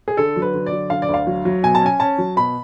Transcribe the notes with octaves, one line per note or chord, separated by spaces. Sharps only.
G#4
D3 A4
F#3
B4
D3
D5
F#3
D3 F5
D5
D2
F5
F#3
F#3
B2 G#5
A5
C#4 G#5
C#4 A5
F#3
B2 B5